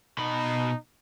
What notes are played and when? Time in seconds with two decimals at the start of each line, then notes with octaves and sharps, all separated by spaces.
0.18 B2 D#4 B5